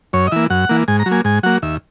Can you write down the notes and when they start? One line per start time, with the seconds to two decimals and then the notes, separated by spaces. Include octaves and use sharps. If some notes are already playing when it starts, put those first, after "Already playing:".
0.13 F#2 C#5
0.27 D#5
0.32 E3 A#3 E5
0.50 F#2 F#5
0.69 E3 A#3
0.88 G#2 G#5
0.99 A#5
1.06 F#3
1.11 A#3 G#5
1.24 G#2 G#5
1.43 F#3 A#3 F#5
1.62 D#2 E5